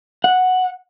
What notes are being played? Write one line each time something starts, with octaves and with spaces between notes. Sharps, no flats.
F#5